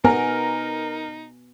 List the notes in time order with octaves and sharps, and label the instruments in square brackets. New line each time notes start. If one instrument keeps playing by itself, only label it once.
[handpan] B3 [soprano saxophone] D#4 [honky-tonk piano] A#4 [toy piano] G#5